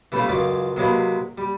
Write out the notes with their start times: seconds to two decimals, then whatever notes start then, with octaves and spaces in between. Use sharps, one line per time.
0.12 E3 G3 A3 C#4 E4 F4
0.29 C#2 F#2 C#4 F4 D5
0.76 C3 F#3 G#3 A#3 E4 B4
1.38 G3